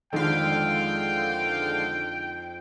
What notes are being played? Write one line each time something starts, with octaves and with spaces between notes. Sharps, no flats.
F2 D3 D#3 G#3 D4 E4 F5 G5